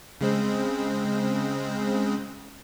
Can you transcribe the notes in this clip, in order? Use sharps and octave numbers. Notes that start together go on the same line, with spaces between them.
C#3 G#3 C4